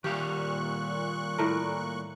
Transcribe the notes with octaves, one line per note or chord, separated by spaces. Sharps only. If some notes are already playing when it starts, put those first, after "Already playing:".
A#2 D#3 G3 G4 F5 C#6 F#6
A2 A3 A#4